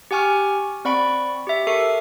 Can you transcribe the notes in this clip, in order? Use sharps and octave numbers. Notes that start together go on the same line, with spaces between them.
G4 F#5 G#5 C#6 F6
C4 D5 F#5 B5 C#6 D7
G4 E5
A4 A#4 E5 C#6 C7 C#7